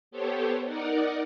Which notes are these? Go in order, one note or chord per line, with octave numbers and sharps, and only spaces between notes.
B3 G4 A4 C5 C#5
D#4 A#4 D5 F#5